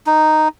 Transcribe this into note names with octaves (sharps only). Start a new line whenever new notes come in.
D#4